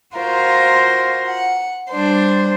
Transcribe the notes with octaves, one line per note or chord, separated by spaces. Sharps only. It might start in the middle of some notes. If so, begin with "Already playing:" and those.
F4 F#4 A#4 C5
F#5
G3 D4 C5